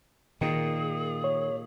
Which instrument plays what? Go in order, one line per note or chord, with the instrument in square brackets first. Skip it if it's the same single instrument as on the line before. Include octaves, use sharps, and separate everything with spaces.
[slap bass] A#2 [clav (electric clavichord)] D#3 [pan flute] G#4
[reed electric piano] C#5